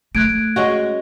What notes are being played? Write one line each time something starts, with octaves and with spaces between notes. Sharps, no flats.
A3 F#6 G#6 D7
G#3 C#4 F#4